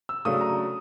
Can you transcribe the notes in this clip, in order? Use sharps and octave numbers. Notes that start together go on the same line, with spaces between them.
E6
C#3 F#3 A3 D4 D#6
A#5